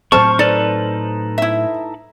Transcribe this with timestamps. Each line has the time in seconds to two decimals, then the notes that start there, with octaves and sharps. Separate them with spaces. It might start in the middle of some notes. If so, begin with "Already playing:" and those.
0.12 A2 F#3 C4 C5 A5 C#6 F6
0.39 D#4 A4 B4 D5
1.38 E4 E5